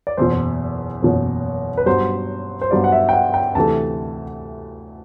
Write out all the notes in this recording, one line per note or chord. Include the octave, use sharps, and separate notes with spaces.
D5
F#1 E2 B2 C5
F#1 E2 B2
B4
G2 F#3 B3 C5
C5
G2 F#3 B3 D5
F#5
E5
G5
F#5
G5
D2 C3 E3 A3 A5